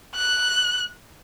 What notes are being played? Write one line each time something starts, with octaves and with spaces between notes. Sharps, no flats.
F#6